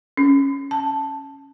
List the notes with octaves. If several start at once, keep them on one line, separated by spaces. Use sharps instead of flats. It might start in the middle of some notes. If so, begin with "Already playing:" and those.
C#4
A5